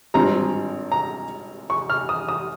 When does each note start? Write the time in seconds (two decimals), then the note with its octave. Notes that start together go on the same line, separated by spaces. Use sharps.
0.14 G#1 G2 G3 C4 F4 A#5
0.92 A#5
1.70 C#6
1.90 F6
2.09 D#6
2.29 D#6